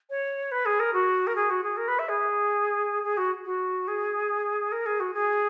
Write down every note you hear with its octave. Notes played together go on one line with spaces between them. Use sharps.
C#5
B4
G#4
A#4
F#4
A#4
G#4
F#4
G#4
A#4
B4
E5
G#4
G#4
F#4
F#4
G#4
A#4
G#4
F#4
G#4